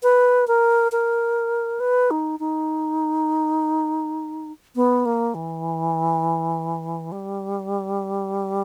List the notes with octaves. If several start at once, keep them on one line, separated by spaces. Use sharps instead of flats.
B4
A#4
A#4
B4
D#4
D#4
B3
A#3
E3
G3